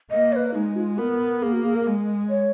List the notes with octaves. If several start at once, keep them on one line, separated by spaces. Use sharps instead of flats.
A#3 D#5
C#5
B4
G#3 D#4
F#4
F4
B3 A#4
A#3 G#4
F#4
G#4
A#4
G#3
C#5